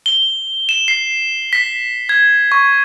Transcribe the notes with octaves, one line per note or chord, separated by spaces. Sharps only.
G7
E7
C7
B6
G#6
C#6